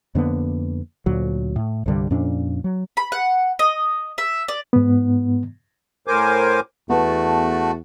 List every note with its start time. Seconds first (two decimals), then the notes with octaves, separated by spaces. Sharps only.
0.15 F2 D3 A#3 B3
1.06 D2 A#2 F#3
1.56 A2
1.86 C2 G2 D3 G3
2.11 F2 A#2 C#4 D4
2.64 F#3
2.97 B5
3.12 F#5
3.59 D#5
4.18 E5
4.48 D5
4.73 G#2 B3
6.08 A2 A#4 C5 G#5 D6
6.90 E2 A3 B3 F#4 A5